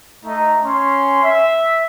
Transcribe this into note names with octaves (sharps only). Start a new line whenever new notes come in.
A3 D#4
C#4 C6
E5